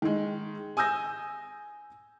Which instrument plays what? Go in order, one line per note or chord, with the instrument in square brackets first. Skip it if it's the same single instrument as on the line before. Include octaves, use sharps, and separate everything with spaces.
[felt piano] D#3 G#3
G#5 D#6 E6 G6 A#6